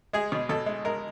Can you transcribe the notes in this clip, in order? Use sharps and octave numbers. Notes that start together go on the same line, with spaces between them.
G#3 G#4
B2
B2 A4
G#3
G#3 A#4